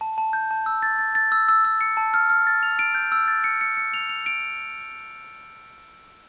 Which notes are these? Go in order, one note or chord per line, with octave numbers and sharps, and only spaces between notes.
A5
A5
G6
A5
E6
A6
A6
A6
E6
E6
E6
C#7
A5
F6
F6
A6
F7
D7
G6
E6
A6
C#7
C#7
C#7
F7
F7
D7